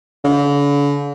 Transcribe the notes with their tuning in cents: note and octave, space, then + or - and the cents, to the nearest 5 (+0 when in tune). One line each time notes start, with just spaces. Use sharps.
D3 -45